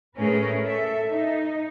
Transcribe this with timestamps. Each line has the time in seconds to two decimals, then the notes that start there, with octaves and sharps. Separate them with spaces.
0.17 A2 A3 C#4 G#4 A#4 B4
0.64 A4 E5
1.11 D#4